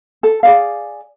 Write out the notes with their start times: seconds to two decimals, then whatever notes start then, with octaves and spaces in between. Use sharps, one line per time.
0.23 A4
0.43 G#4 D5 F5